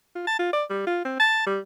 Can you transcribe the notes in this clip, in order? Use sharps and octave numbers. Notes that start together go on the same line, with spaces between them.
F4
A5
F4
D5
G3
F4
C4
A5
G3